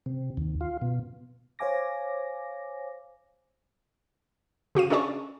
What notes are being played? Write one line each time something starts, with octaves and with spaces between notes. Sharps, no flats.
C3
D#2
F4
B2
C5 C#5 F5 G#5 D6 A#6
C#3 F#4 F5 D#7
C#4 D4 G#4 D5 A5 C#6